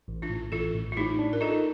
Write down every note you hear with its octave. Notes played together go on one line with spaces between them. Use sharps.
A1
D4 F4
A2
A1 F4 A4
A2
F4
A2 D#4 G4
D4
A#4
D#4 F4 A4